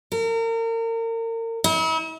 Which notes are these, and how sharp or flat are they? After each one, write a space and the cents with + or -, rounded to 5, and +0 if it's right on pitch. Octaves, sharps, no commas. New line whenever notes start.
A#4 -35
E4 -40